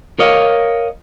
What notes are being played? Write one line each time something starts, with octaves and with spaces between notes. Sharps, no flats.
A#4 C#5 D#5 F5